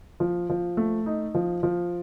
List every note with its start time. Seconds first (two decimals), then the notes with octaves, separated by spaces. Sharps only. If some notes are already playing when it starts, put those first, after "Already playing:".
0.20 F3
0.50 F3
0.77 A3
1.06 D#4
1.35 F3
1.63 F3